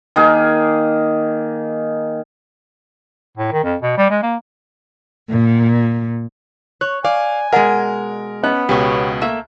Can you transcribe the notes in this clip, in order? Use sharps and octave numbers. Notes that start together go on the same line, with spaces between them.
D#3 A#3 G#4
A2
D#3
F2
B2
G3
G#3
A#3
A#2
C#5 F#6
D5 F5 G#5
B2 G#3 A#4 D#5 F#5
B3 C#4 D#5 F#6
C#2 B2 G4 C#5
A3 A#3 E5